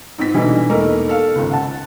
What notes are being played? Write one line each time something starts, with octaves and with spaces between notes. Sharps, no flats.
G#2 C4 B6
B2 D3 E3 G3 D#4
E1 A3 A#3 D#4 A#4
A4 F5
G#1 C#2
F#5 A5